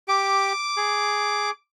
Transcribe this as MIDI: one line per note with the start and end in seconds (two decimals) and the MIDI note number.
0.08 0.53 67
0.08 1.49 86
0.77 1.51 68